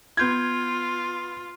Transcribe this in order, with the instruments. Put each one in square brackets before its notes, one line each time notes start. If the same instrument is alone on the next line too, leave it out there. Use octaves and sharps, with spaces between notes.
[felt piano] B3 G6 G#6 [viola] F4